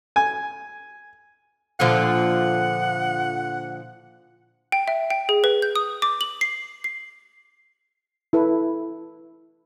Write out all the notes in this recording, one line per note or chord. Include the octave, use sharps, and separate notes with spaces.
G#5
A#2 D3 F3 F#5
G5
E5
G5
G#4
B4
G6
D#6
D6
F#7
C7
C7
E4 A4 B4